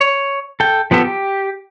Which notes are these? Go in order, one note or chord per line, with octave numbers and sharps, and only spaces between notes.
C#5
A4 G5
F3 B3 G4 A4
G4